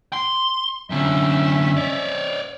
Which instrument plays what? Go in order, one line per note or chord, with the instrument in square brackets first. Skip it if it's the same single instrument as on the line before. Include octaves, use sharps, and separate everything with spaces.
[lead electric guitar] C6
[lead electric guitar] F#2 D3 [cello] C#4 E5
[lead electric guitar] C#5 D5